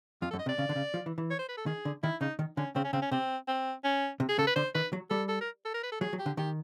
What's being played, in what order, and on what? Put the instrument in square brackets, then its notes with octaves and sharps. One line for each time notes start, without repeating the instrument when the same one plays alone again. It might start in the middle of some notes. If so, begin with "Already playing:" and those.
[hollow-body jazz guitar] F2 [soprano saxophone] F4
[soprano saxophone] A4
[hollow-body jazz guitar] F#2
[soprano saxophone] D#5
[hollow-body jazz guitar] C3
[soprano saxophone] D5
[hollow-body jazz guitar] C#3
D3
C#3
F3
E3
E3
[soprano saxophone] C#5
C5
B4
A4
[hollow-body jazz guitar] D#3 [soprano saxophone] G#4
[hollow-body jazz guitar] D3
[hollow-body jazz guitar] D#3 [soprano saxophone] E4
[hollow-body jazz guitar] C#3 [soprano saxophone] D#4
[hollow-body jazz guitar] D#3
[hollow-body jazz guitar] D3 [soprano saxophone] C#4
[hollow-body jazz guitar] C#3 [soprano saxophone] C4
[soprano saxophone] C#4
[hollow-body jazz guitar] C#3 [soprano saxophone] C4
[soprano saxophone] C#4
[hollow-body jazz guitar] C3 [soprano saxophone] C4
[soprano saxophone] C4
C#4
[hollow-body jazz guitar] C3
[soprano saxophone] G#4
[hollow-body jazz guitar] C#3 [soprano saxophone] A4
[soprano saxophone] B4
[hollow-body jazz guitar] D3 [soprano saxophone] C5
[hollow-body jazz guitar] D#3 [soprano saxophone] B4
[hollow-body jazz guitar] F#3
[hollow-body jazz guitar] G3 [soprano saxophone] A4
[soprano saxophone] A4
A#4
A4
A#4
B4
A4
[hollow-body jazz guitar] F#3 [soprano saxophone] G#4
[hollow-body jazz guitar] F#3
[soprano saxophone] G4
[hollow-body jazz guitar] D3
[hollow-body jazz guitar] D#3 [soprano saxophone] G4